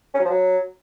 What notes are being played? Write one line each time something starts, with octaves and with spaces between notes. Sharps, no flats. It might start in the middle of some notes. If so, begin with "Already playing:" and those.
C#4
F#3
F3
F#3